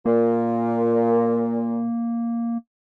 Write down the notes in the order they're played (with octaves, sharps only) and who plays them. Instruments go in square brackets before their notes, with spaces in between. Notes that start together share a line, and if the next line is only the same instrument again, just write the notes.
[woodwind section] A#2 [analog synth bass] A#3